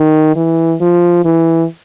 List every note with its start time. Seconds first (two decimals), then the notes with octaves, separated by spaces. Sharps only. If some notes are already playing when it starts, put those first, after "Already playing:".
Already playing: D#3
0.36 E3
0.81 F3
1.25 E3